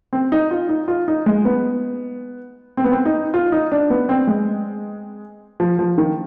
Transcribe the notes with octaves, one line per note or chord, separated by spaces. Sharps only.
C4
D#4
F4
D#4
F4
D#4
G#3
B3
C4
B3
C4
D#4
F4
D#4
D4
B3
C4
G#3
F3
F3
D#3